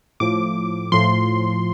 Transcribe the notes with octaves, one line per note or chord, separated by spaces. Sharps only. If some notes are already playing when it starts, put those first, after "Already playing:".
A2 F3 D6
A2 F3 C6